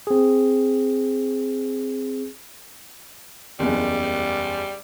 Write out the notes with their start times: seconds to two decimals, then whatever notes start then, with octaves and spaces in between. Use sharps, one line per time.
0.07 C4 G#4
3.59 F#1 E2 G3